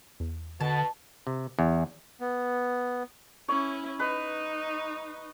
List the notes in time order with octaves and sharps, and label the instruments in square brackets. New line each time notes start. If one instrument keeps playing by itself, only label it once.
[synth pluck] E2
[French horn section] B2 [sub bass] D3 [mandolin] A5
[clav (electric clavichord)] C3
E2
[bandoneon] B3
[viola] C#4 E4 [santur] C#5
[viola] D#4 [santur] B4